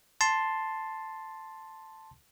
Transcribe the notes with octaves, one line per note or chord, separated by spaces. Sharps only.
A5 C6